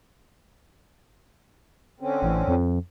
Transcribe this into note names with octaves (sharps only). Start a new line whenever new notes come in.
D3 C4 C#4
A1
F2